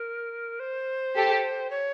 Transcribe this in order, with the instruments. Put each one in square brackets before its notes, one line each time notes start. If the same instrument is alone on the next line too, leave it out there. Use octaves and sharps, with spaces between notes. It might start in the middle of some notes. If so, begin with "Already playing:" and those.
Already playing: [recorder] A#4
C5
[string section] G4 A4
[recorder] C#5